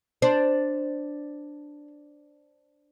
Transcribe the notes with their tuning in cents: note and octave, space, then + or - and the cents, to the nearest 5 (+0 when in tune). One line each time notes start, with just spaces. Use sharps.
D4 +0 C5 +0